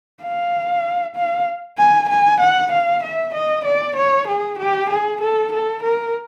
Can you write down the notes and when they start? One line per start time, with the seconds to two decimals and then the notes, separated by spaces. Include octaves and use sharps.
0.22 F5
1.16 F5
1.79 G#5
2.09 G#5
2.41 F#5
2.72 F5
3.03 E5
3.34 D#5
3.65 D5
3.96 C#5
4.28 G#4
4.59 G4
4.90 G#4
5.21 A4
5.53 A4
5.83 A#4